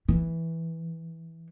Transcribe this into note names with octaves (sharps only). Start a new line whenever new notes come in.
E3